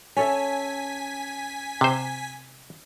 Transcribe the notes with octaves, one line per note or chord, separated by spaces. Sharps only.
C#4 A4 E5 G#5 B6
C3 C5